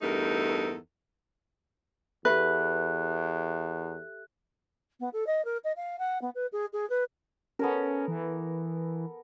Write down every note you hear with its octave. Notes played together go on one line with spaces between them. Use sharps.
E2 G2 A3 D#4 A4 A#4
E2 G4 A4 B4 E5 F#6
B3
A4
D#5
A#4
D#5
F5
F#5
B3
B4
G#4
G#4
B4
B3 C#4 A4 A#4
E3